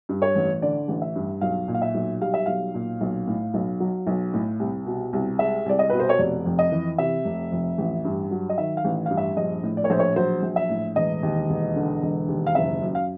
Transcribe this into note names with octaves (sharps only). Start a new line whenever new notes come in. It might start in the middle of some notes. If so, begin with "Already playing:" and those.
G2
C#5
A1
D3 D5
A1
E5
G2
B1 F5
A#2
F5
E5
B1
G3 F5
E5
B1 F5
A#2
B1
A2
B1
F#3
B1
A2
C2
B2
C2
G#3 E5
C2 D5
D#5
B2 B4
C5
C#5
F1 D5
F2
D#5
E3
C3 E5
F1
F2
A1
G2
F#3
D#5
D#3 E5
F5
A1
G2 F5
E5
A#1 D#5
A2
D5
C#5
A#1 C5
C#5
F#3 C5
A#1
E5
A2
E1 D#5
D#2
E1
D3
E1
D#2
F5
F#1 E5
F#2
F5